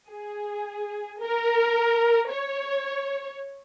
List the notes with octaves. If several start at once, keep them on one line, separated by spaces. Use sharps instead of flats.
G#4
A#4
C#5